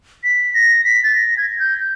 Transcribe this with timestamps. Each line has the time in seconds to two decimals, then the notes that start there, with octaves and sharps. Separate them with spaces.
0.24 B6
0.54 A#6
0.84 B6
1.03 A6
1.15 A#6
1.37 G#6
1.60 G6